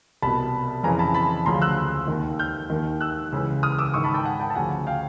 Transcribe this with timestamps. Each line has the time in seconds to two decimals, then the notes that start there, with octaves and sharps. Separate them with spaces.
0.22 C2 B2 A5 B5
0.83 F2 C#3 E3 G#5 A#5
0.99 A5 B5
1.14 A5 B5
1.46 D2 C#3 F3 A#5 C6
1.62 E6 F#6
2.07 D#2 D#3
2.39 F6 G6
2.70 D#2 D#3
3.01 E6 F#6
3.32 C#2 C#3 E3
3.63 D#6 F6
3.79 D6 E6
3.94 G#2 D#3 C#6 D#6
4.04 A5 B5
4.14 G5 A5
4.24 F#5 G#5
4.40 G5 A5
4.50 A5
4.55 D2 C#3 F3 F#5 G#5
4.87 F5 G5